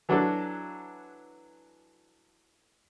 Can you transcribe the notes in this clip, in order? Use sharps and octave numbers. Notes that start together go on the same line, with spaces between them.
E3 F#3 D4 F#4 A4